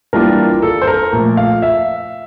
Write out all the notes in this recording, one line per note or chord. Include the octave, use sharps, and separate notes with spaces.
E3 G3 A#3 D4 F4 A#4
A4
C5
A#4
A#2 F3 A3
F5
E5